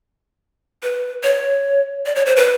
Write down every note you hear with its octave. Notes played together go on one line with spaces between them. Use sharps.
B4
C#5
D5
C#5
C5
B4